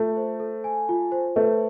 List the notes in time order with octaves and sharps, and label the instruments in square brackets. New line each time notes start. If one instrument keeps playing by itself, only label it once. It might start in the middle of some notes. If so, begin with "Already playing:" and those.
Already playing: [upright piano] A3 [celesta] F4
[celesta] C5
A4
G#5
F4
C5
[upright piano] A3 [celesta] B4